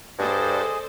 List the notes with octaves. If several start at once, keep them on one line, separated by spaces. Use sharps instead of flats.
G2 G#4 A4 C5 D5 D#5